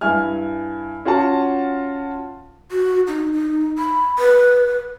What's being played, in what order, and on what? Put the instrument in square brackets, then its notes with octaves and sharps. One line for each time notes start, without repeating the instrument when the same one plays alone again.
[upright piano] G2 E4 G#5 F6
C#4 F4 F#4 F#5 A5
[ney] F#4
D#4
D#4
B5
B4